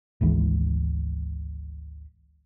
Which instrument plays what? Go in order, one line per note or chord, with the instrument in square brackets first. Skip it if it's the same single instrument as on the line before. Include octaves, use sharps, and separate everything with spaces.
[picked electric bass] G#1 D2 E3 G#3